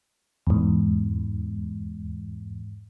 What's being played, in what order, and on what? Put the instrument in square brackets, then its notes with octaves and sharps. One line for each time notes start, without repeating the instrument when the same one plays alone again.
[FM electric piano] E2 G#2